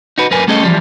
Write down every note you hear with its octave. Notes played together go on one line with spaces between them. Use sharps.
D#4 F#4 B4
F#2 A#4 B4 G#5
G3 A3 C#4 G#4 A4 D#5
E3 F3 G3